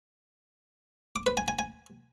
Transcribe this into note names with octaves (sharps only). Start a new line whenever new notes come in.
D6
B4
G#5
G#5
G#5